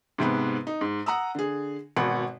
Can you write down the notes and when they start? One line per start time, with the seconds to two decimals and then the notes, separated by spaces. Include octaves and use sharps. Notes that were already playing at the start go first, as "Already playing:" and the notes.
0.18 G#2 C3 B3 B5
0.67 D#4
0.81 G#2
1.06 F#5 A#5 D#6 E6
1.35 D3 G#4
1.97 G#1 B2 F#5 B5